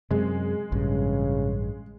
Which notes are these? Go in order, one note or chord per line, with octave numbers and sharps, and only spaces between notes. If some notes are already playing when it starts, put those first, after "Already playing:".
F#2 C3 G#3
A1 G2 C#3